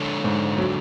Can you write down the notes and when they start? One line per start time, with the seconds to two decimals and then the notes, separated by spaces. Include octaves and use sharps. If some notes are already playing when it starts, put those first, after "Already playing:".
Already playing: D3 G#3 D4 A4 C#5
0.24 G#2
0.58 F#3